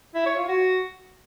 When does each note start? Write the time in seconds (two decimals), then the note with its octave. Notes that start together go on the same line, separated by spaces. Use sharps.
0.15 E4
0.26 C#5
0.37 F4
0.48 F#4